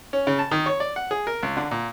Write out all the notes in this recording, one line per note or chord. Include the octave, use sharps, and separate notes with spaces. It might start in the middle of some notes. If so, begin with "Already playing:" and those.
C#4
C#3
A5
D#3
C#5
D5
F#5
G#4
A#4
C#2
D3
A#2